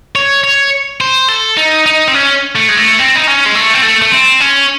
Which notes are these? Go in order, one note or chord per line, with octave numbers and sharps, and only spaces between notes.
C#5
C#5
C5
A4
D#4
D#4
C4
C#4
A3
G#3
A3
C4
D#4
C#4
G#3
A3
C4
A3
A3
C4
C#4